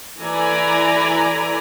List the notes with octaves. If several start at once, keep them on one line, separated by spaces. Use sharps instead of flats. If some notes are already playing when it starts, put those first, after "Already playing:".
E3 A4 D5 G#5 A#5 B5